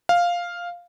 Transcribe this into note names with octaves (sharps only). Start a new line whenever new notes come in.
F5